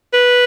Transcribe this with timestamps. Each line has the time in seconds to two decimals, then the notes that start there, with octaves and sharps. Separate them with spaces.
0.14 B4